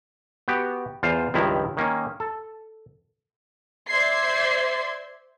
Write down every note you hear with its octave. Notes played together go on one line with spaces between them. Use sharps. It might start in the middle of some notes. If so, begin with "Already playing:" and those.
B3 F#4 G4
E2 F4 C5 F5
C#2 G2 D#3 F3 E4 A#5
D#3 A#3 C#4
A4
C5 D5 E5 C6 G#6 C7